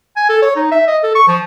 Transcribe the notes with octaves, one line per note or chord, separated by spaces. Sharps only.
G#5
A4
C#5
D#4
E5
D#5
A4
C#6
F3